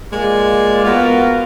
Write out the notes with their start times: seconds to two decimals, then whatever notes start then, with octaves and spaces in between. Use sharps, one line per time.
0.12 G#3 A#3 F4 D5
0.85 B3 F4 F#4 A#4